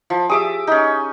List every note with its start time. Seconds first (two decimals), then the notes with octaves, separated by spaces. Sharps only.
0.10 F3
0.29 G4 G#4 E5 G#5 D6 D#6
0.67 C#4 D#4